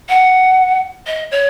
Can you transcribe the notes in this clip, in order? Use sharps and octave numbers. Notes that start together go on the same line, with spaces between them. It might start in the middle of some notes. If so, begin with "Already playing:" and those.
F#5
D#5
C#5